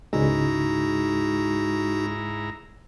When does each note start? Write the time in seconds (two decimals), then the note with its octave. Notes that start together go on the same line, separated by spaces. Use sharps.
0.13 C#2 G#2 G#3 D#4 E4 F#4 A#5